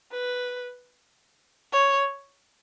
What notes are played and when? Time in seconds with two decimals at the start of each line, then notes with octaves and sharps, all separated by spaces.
0.12 B4
1.72 C#5